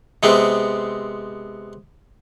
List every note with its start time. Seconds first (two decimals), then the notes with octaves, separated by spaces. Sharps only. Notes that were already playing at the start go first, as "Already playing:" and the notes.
0.23 C3 G#3 B3 C4